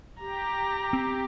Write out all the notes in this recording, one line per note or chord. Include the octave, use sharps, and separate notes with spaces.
G4 A#5
C4